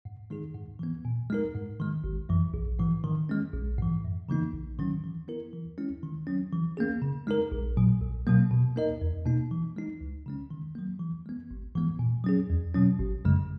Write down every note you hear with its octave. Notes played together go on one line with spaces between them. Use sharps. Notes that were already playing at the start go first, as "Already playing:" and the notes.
G#2
D#3 G#3 D#4 G#4
G#2
E3 B3
A#2
G#3 D#4 A#4
G#2
D#3 G#3
G#1
F#2 E3
A#1
G#2 E3
D#3
G#3 C#4
A#1
G#2 E3
F#2
C#3 E3 A#3 D#4
A#1
G#2 D#3 F#3 C#4
E3
B3 E4 A#4
E3
G#3 C#4 E4
D#3
F#3 C#4
E3
A#3 C#4 G#4
C#3
G#3 D#4 A#4
A#1
A#2 F#3
B1
B2 F#3 A#3
B2
A#3 D#4 A#4 D#5
E2
B2 A#3 D#4
E3
G#3 D#4
C#2
C#3 G#3 C#4
D#3
F#3 A#3
E3
G#3 B3
G#1
G#2 E3 G#3 B3
A#2
F#3 C#4 G#4
E2
B2 F#3 C#4
G#1
F#2 C#3 G#3